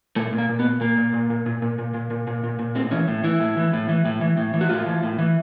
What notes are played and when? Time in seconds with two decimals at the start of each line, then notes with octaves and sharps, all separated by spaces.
0.16 A#2 A3
0.32 A#2
0.38 A#3
0.49 A#2
0.59 B3
0.65 A#2
0.81 A#2 A#3
0.98 A#2
1.14 A#2
1.30 A#2
1.46 A#2
1.62 A#2
1.79 A#2
1.94 A#2
2.11 A#2
2.27 A#2
2.43 A#2
2.59 A#2
2.75 A2 C4
2.91 E3 C#4
3.08 A2
3.24 E3 E4
3.40 A2
3.57 E3
3.73 A2
3.89 E3
4.05 A2
4.21 E3
4.37 A2
4.54 E3
4.61 F#4
4.69 A2 F4
4.86 E3
5.03 A2
5.18 E3